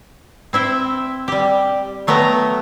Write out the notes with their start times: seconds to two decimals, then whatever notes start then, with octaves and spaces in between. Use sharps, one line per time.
0.53 C4 E4 E5 G5
1.28 G3 G4
2.07 F#3 A3 B3 G5 A#5